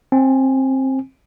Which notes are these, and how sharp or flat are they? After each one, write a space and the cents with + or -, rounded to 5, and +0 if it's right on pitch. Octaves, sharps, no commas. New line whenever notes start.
C4 +20 G#5 +0